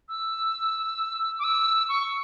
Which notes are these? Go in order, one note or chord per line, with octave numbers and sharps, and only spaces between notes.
E6
D6
E6
C#6